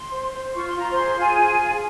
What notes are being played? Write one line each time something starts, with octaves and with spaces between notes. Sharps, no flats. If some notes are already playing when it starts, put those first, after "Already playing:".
Already playing: C6
C5
C5
F4 C#6
C6
F4 A#5
C5 C6
G#4
F4 G#4 G#5
F4
F4